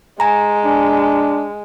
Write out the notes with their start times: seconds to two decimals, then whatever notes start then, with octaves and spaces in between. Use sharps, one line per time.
0.20 G#3 G#5 A#5
0.65 D4